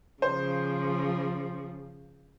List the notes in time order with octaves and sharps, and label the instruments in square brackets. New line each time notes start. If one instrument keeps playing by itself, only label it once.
[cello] C#3 F3 [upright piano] C5